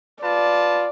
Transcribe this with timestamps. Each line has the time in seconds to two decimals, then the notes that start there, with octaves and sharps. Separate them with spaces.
0.22 F4 B4 D5 A5